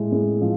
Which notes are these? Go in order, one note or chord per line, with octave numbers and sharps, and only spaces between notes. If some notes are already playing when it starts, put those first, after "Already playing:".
Already playing: A2 G#3
A2
F3